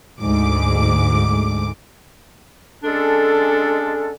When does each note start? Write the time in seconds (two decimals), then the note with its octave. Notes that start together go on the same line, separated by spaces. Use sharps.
0.20 D2 G#2 D6
2.83 D3 G#3 C#4 D4 A4